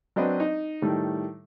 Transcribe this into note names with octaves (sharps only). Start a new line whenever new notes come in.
F#3 C4 D4 B4 D#5
D#4
A2 D#3 G3 A3